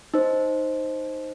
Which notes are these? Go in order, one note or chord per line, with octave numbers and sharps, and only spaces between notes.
D#4 C5